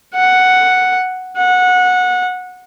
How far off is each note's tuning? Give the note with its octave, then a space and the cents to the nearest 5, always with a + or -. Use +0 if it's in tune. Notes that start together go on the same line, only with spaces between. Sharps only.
F#5 +0
F#5 -20